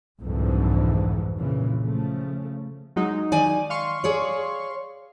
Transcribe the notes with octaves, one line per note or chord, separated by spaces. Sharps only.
C2 F2 G#2 D3 E3
A#2 C#3 E3
C#3 F3 A3
F#3 G#3 D#4
D#3 D5 G#5
F5 C6 C#6
G#4 C#5 D5